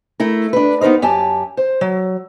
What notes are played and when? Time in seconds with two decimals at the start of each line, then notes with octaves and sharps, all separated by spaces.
0.20 A3 E4 A#4
0.53 D4 B4
0.81 B3 D#4 G4 A#4 C5
1.02 F#2 G4 G#5 A5
1.57 C5
1.81 F#3